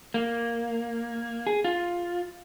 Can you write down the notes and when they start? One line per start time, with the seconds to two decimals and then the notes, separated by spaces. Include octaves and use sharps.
0.14 A#3
1.47 G#4
1.64 F4